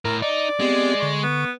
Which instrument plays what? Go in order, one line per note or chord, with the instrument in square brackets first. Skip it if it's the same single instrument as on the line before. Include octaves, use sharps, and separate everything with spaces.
[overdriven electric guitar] A2 [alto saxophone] A#4
[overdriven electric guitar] D#4 [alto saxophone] D5
[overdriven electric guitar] G#3 [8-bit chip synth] B3 C4 G4
[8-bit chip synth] D3 C#6
[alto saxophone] B3